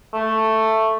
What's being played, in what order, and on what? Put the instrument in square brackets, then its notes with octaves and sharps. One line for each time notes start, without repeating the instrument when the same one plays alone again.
[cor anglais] A3